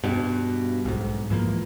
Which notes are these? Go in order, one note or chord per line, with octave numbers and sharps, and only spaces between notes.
G2 B2
B1 G#2
G#2 E3 F3 A#3